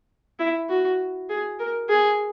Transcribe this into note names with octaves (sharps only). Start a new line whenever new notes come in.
E4
F#4
G#4
A#4
G#4